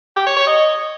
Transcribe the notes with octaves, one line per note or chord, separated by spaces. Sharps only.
G4
C#5
C#5
D#5